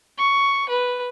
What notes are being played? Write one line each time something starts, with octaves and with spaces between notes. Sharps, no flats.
C#6
B4